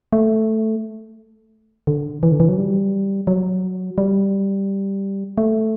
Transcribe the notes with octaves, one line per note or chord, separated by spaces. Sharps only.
A3
D3
E3
D3
E3
F#3
G3
F#3
G3
A3